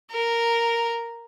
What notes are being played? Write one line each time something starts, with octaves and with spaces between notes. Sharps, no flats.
A#4